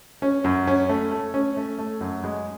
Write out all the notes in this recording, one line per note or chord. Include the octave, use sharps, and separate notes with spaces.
C#4
F#2
C#4
A3
A3
C#4
A3
A3
F#2
G#3